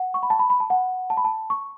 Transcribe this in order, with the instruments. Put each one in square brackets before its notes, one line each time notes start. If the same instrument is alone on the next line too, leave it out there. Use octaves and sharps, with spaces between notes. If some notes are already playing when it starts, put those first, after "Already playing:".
Already playing: [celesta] F#5
C#6
B5
A5
B5
B5
A5
F#5
A5
B5
A5
C#6